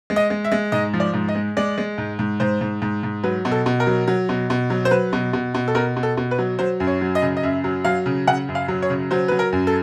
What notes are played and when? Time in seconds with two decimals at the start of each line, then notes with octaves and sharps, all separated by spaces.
0.10 G#3
0.16 D#5
0.30 G#3
0.44 E5
0.52 G#3
0.72 G#2 D#5
0.93 F3
1.00 D5
1.14 G#2
1.28 D#5
1.35 G#3
1.57 G#3 D5
1.78 G#3
1.98 G#2
2.19 G#2
2.40 G#2 C5
2.61 G#2
2.82 G#2
3.03 G#2
3.24 F#3 B4
3.45 B2
3.52 A4
3.66 B2
3.80 A#4
3.87 F#3
4.08 F#3
4.29 B2
4.50 B2
4.70 F#3
4.85 C5
4.91 F#3 B4
5.13 B2
5.33 B2
5.54 B2
5.68 A4
5.75 B2 A#4
5.96 B2
6.03 A4
6.17 B2
6.31 B4
6.38 F#3
6.59 F#3 C5
6.80 F#2
6.87 C#5
7.01 F#3
7.15 D#5
7.22 C#3
7.37 D#5
7.43 F#2 E5
7.64 F#3
7.85 F#3 F5
8.06 C#3
8.27 C#3 F#5
8.48 F#2
8.55 F5
8.68 F#3
8.82 C#5
8.90 C#3
9.11 F#3 C5
9.28 F#3 B4
9.39 A#4
9.52 F#2
9.67 A4